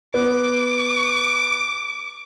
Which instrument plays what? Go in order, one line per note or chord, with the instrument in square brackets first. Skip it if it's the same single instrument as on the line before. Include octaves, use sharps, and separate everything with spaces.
[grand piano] B3 [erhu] D6